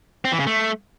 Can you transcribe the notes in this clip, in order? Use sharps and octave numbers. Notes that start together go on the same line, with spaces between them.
C4
E3
C#3
A3